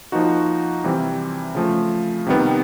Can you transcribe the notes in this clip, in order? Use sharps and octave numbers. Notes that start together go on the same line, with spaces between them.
F3 A#3 D#4 F#4
C3 E3 G3 C4
C#3 F3 A3
C3 D#3 G3 B3